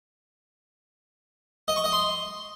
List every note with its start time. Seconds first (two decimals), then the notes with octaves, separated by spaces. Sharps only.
1.68 D#5
1.76 C#6
1.84 D#5
1.92 C6